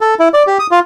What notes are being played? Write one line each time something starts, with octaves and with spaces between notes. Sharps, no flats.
A4
E4
D5
G4
D#6
F4